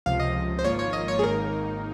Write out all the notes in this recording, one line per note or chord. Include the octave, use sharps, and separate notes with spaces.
C#2 C3 F3 F5
D#5
C5
G#1 G#2 F3 A#3 F4 C#5
C#5
D#5
C#5
G#4
G#1 G#2 D#3 A#3 D#4 A#4